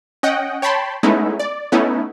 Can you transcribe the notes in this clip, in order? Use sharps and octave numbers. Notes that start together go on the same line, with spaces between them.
C#4 D#5 F#5 G5
C#5 G5 A5 B5 C6
G#3 A3 B3 C#4 D#4 E4
D5
A3 B3 C#4 D#4 E4